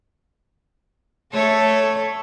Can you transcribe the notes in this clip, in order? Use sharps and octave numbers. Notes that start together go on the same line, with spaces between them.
A3 A4 C#5